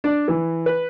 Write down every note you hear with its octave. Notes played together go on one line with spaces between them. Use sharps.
D4
E3
B4